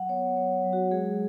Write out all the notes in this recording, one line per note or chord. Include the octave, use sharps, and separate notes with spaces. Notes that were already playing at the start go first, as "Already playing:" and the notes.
Already playing: F#3 F#5
B3 C#5
F#3 C#5
F#3
F#4
G#3 G#4